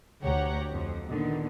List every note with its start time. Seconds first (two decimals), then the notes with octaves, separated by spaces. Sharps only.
0.21 D2 G4 C#5 F#5 A#5
0.70 F2
1.09 A#2 D3 D#3 B3